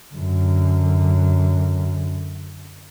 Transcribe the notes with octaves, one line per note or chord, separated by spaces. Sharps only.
F#2 D3